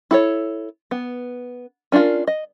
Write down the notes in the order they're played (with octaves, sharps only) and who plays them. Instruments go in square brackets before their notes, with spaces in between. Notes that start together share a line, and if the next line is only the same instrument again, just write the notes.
[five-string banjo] E4 A4 C#5
B3
C#4 D4 E4 F4 A#4
D#5